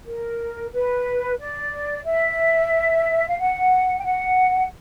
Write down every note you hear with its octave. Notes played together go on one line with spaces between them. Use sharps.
A#4
B4
D5
E5
F5
F#5
G5
F#5